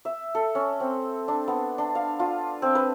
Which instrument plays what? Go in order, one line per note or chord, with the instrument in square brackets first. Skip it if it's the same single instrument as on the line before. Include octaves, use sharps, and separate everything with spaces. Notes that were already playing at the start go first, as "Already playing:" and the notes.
[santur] E5
A4
C#4
C4
D4
B3
D4
F5
F4
C4
B4